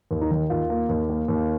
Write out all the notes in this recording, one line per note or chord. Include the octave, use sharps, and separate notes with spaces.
D#2
D#4
D#3
D#2 F4
A#3
D#2
A#3
D#2